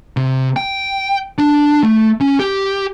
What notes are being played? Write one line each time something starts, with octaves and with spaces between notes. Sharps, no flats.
C3
G5
D4
A3
C#4
G4